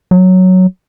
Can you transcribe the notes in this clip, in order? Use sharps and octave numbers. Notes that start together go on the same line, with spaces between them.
F#3